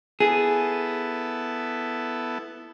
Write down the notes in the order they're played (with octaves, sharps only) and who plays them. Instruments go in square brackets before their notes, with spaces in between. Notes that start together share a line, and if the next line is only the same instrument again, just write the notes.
[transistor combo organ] B3 E4 A4 [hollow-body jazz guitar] G#4